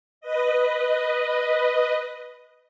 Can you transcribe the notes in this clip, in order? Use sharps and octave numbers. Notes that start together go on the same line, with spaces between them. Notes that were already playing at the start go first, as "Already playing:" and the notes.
B4 D#5